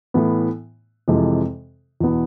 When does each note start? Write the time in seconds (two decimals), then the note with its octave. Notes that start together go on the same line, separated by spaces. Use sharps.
0.14 A2 E3 B3
1.08 F2 C3 E3 G#3
2.00 E2 B2 B3